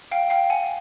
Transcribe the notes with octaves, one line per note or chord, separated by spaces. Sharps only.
F5 G5
F5 G5
F#5 G#5